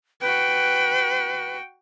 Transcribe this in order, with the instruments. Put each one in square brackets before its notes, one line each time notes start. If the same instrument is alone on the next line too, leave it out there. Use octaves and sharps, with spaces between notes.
[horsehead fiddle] F#4 G5 [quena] B4